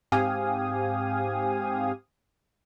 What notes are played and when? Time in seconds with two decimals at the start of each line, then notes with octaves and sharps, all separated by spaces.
0.12 G#2 C4 G4 F5 G#5 D#6